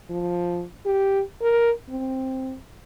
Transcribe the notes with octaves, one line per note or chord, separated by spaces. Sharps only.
F3
G4
A#4
C4